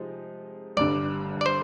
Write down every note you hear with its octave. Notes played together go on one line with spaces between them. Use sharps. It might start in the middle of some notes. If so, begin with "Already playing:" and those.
Already playing: C3 F3 G#3 D#4
G1 G2 D3 D5
D5
C5